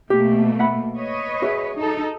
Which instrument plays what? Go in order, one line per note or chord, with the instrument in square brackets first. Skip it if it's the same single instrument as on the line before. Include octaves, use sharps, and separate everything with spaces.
[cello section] B2 A3 A#3 [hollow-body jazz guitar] G4
[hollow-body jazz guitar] E5 F#5 B5
[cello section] B4 C#5 D#5
[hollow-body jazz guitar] F#4 G#4 E5
[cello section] D#4 A4